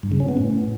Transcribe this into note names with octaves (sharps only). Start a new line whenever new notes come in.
G2
C#3
C#4
B3
A2